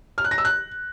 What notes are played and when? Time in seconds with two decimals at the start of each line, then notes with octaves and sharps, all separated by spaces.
0.18 F6
0.24 F#6
0.31 A#6
0.38 E6
0.45 F#6